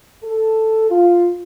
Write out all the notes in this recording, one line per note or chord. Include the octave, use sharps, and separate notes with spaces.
A4
F4